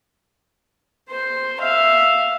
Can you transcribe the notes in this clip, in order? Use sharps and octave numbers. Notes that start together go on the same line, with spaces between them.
C5 C6
E5 F5